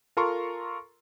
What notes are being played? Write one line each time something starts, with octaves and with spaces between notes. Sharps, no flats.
F4 A4 A#4 A#5 C6 C#6